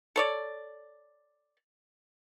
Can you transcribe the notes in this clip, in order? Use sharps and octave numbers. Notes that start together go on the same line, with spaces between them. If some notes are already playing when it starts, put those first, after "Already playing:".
A4 C#5 D5